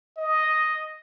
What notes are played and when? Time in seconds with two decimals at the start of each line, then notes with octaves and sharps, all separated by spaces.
0.17 D#5